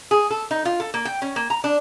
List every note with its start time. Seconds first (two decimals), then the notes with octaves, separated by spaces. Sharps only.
0.11 G#4
0.30 A4
0.51 D#4
0.65 F4
0.80 A4
0.94 A#3
1.05 G5
1.22 C#4
1.36 A#3
1.50 A#5
1.64 D4